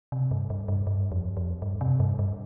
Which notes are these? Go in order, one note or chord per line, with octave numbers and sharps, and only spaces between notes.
C3
G2
G2
G2
G2
F2
F2
G2
C3
G2
G2